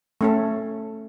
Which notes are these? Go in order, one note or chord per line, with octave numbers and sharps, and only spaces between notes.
A3 C#4 A4